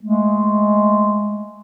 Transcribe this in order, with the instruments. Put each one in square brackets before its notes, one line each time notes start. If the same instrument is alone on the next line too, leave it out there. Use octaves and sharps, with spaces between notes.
[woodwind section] G#3 A3